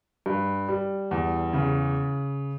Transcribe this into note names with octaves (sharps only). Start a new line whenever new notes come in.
G2
G3
E2
C#3